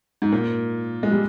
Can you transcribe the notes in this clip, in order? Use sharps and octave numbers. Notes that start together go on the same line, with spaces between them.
G#2
A#2
G#3
G3